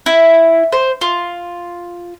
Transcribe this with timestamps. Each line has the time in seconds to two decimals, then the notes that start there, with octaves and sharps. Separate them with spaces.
0.06 E4
0.73 C5
1.01 F4